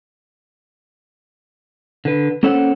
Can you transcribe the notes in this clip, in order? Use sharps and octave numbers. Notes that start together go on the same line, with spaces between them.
D3 B4
A#3 C#4 A4 C5 C#5 F#5